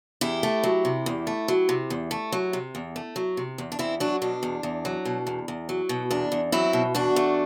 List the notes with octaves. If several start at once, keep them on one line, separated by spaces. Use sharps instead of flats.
E2 E4 G4
A3
F#3
C3
E2
A3
F#3
C3
E2
A3
F#3
C3
E2
A3
F#3
C3
E2
D4
E2 C4 E4
F#3 D4 F#4
B2 D4
E2
E2
F#3
B2
E2
E2
F#3
B2
E2 D4
E2
F#3 C4 E4
B2
E2 D4 F#4
A3